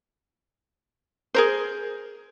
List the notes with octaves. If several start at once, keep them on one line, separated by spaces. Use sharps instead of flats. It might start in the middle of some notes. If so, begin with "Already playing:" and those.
G#4 A#4 C5